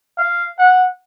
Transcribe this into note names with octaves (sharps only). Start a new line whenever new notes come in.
F5
F#5